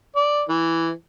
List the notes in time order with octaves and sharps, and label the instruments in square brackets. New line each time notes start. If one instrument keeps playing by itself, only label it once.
[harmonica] D5
E3